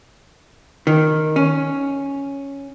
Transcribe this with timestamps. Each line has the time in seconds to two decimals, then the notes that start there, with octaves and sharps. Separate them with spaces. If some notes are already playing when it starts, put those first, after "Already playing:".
0.87 D#3
1.36 C#4